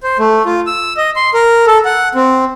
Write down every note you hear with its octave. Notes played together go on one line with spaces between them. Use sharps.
C5
A3
F4
E6
D#5
C6
A#4
A4
F#5
C4